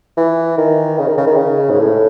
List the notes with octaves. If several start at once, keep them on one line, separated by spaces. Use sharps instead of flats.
E3
D#3
C#3
D#3
C#3
D#3
C#3
G#2
A2